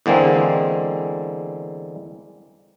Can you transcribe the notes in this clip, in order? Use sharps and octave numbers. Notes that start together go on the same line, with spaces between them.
E2 D3 G#3 A#3 C4